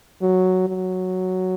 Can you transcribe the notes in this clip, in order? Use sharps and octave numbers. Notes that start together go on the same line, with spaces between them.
F#3
F#3